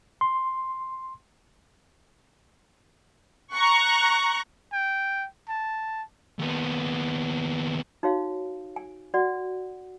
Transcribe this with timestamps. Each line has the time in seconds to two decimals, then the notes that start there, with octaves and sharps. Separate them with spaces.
0.21 C6
3.53 A#5 C#6 F#6
4.73 G5
5.49 A5
6.39 D#2 B3
8.03 D#4 F#4 C#5 F5
8.76 G#5
9.14 F#4 D5 F#5